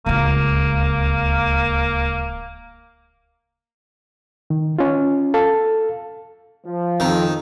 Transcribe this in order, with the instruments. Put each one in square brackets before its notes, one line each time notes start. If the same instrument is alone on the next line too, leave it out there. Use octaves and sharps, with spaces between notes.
[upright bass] D1 C#2 [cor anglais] A#3
[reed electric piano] D#3
C#4 F4
A4 F5
[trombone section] F3
[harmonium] F2 [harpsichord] D#3 [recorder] C4